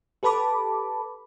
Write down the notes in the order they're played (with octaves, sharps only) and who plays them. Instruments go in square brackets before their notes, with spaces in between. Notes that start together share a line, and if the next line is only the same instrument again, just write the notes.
[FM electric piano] G4 A4 B4 A5 B5 D6